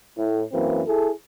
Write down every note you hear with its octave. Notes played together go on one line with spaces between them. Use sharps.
A2
F#2 E3 A#3 C4
E4 G#4 A4